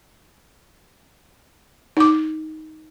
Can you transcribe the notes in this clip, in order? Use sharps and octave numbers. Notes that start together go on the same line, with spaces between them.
D#4 D6